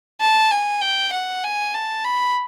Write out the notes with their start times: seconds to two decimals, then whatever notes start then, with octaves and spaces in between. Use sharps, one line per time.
0.21 A5
0.51 G#5
0.81 G5
1.13 F#5
1.44 G#5
1.74 A5
2.05 B5